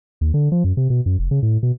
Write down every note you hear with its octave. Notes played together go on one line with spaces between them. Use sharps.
D#2
D3
F3
F#2
C3
B2
F#2
F1
C#3
A2
B2